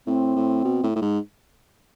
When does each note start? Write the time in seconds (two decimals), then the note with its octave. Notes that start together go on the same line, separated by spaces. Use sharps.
0.07 A2 C4
0.36 A2
0.64 B2
0.83 A2
0.96 A2
1.02 G#2